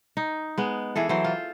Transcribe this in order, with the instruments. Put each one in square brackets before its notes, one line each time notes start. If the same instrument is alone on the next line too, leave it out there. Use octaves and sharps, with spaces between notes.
[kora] D#4
G#3 B3
E3 G#4 A4
E3 F#3 C5
F4